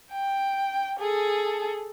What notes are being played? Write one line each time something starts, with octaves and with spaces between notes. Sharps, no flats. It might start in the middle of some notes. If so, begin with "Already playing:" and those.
G5
G#4 A4